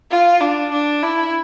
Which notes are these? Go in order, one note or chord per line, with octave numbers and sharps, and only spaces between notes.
F4
D4
D4
E4